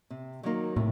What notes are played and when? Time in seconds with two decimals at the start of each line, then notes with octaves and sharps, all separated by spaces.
0.10 C3
0.43 D#3 F#3 A#3 D#4
0.76 A2 C3